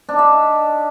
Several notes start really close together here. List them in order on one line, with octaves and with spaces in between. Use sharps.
D4 D#4 E5